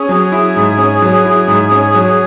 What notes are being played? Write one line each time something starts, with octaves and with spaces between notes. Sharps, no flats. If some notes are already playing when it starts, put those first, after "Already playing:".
Already playing: C#4 G#4
F#3
E4
G#2
C#4
F#3
E4
G#2
C#4
F#3